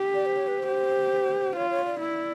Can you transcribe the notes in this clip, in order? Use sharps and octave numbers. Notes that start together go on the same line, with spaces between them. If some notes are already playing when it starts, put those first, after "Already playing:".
Already playing: G4
D5
C5
C#5
B4
C5
G4
F4 C#5
C#5
D5
E4